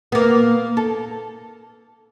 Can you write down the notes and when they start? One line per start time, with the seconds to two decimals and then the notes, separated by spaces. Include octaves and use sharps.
0.12 A#3 B3
0.77 A4